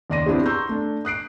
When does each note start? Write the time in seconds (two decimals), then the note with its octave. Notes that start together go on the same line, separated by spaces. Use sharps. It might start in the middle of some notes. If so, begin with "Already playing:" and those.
0.10 D#2 C#3 D5 C6 A#6 D#7
0.26 B3 C4 D4 E4 G4 G#4
0.46 A#5 C6 C#6 E6 G6
0.69 A3 D4
1.05 D#6 F#6 C7 D7